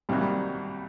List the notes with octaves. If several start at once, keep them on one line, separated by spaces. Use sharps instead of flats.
C2 C3 D#3 F#3 G3 A#3
G3